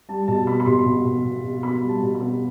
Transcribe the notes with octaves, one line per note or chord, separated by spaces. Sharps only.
G3 A5
B2 A5
B3 B5
B5
B2 C6
B2
B2
B2
B2
B3 B5
G3
A5
B2
B5
B3